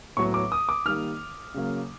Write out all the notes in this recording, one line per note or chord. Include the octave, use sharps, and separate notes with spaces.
A2 F#3 B3 C#6
D6
D#6
D6
D#3 G3 A#3 F6
C#3 F#3 A#3